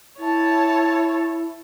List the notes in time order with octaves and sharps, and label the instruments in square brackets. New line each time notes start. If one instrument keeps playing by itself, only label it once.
[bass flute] E4 [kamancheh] C#5 A5